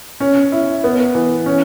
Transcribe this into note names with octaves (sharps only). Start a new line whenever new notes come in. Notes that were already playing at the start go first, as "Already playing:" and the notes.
C#4
E4
B3
E3
C#4